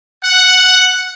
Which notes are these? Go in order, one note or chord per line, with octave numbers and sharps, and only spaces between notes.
F#5